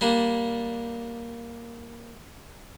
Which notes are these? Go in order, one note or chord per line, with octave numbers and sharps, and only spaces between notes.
G3 A#3 D4